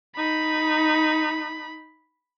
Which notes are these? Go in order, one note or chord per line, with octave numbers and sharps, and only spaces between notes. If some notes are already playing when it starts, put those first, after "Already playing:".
D#4 B5